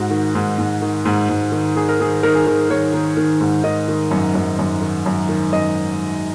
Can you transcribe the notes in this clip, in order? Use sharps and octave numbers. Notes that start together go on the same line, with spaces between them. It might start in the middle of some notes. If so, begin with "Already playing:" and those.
Already playing: G#2 F#4
D#3
G#2
G#2
D#3
G#2
G#2
D#3
D#3 G#4
A#4
D#3 G#4
D#3 A#4
G#4
D#3 A#4
D#3 C#5
D#3
D#3
G#2
D#3 D#5
D#3
F#2
F#2
F#2
D#3
F#2
D#3
F#2 D#5